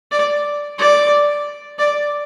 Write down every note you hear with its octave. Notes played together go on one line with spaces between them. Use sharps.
D5
D5
D5